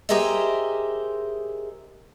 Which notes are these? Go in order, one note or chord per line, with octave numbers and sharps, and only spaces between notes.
G4 G#4 A#4 C5 D#5 E5